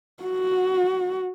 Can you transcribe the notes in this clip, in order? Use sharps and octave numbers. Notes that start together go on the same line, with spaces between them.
F#4